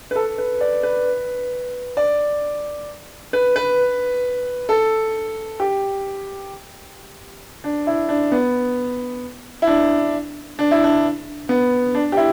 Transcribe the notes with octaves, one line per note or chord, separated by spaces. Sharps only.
B4
A4
B4
D5
B4
D5
B4
B4
A4
G4
D4
E4
D4
B3
E4
D4
D4
E4
D4
B3
D4
G4
E4